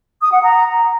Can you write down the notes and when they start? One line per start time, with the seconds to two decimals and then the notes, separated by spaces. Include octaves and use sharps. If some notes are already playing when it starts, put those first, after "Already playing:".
0.21 D#6
0.32 F#5
0.42 A#5